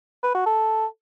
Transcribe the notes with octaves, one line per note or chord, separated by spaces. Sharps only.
B4
F#4
A4